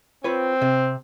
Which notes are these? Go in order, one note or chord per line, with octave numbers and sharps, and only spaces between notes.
C4 F4 B4 C#5
C3